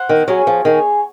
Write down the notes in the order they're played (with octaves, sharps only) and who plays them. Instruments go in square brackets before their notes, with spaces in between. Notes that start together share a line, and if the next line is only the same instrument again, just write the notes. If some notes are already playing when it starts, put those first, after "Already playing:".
Already playing: [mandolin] C5 F#5
[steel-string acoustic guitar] D#3
[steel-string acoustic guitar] F#3 [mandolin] C#4 G#4 C#5 G#5
[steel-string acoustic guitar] F3
[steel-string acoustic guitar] D#3 [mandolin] G#4 C#5 G#5